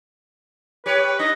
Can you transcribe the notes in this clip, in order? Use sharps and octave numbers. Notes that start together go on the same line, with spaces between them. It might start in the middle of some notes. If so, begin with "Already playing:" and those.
G4 B4 C#5
D4 D#5